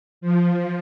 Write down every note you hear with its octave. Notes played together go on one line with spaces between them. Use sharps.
F3